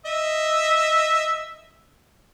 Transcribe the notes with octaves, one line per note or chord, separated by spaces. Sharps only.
D#5 E5